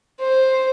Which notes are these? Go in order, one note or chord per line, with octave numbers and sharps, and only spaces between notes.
C5